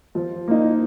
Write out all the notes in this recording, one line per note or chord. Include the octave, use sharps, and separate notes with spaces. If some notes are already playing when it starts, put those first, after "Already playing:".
F3
A#3 D#4